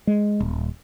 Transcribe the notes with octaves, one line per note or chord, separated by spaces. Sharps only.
G#3
D#1